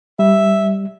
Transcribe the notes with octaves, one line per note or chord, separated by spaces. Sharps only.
G3 E5